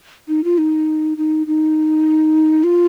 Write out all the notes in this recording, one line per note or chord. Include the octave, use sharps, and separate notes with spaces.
D#4
F4
D#4
D#4
D#4
F4